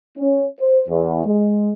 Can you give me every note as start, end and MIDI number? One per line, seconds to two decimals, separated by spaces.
0.18 0.45 61
0.61 0.82 72
0.89 1.23 40
1.25 1.72 56